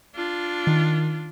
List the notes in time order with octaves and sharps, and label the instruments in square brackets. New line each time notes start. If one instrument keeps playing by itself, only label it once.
[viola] D4 F4
[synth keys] D#3